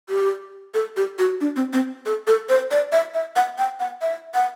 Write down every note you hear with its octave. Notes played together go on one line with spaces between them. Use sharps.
G4
A4
G4
F#4
D4
C4
C4
A4
A4
C5
D5
E5
E5
F#5
G5
F#5
E5
F#5